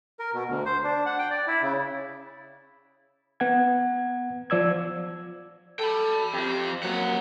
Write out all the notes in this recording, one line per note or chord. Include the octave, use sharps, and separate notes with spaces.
A#4
B2
D2
C5
D4
F#5
G5
D5
E4
C#3
B3 F#5 G#6
F3 D5 E6 G#6
A4 G5 B5
F2 C4 G4
F#3 A#3 F#5